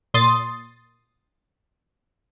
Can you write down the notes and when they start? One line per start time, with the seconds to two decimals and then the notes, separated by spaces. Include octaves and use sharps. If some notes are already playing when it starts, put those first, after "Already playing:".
0.14 A#2 C6 D#6 A6